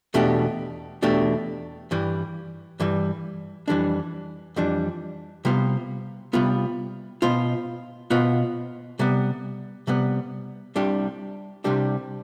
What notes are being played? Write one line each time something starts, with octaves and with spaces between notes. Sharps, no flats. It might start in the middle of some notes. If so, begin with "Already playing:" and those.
E2 B2 A3 D4 G4
E2 B2 A3 D4 G4
G2 E3 G3
G2 E3 G3
F2 E3 G3 D4
F2 E3 G3 D4
C3 G3 B3 F4
C3 G3 B3 F4
B2 B3 F4 C5
B2 B3 F4 C5
C3 G3 B3
C3 G3 B3
C2 C3 G3 D4 G4
C2 C3 G3 D4 G4